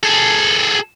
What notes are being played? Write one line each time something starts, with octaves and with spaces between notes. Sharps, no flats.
G#4 A4